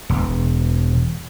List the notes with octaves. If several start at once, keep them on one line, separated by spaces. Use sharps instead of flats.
E1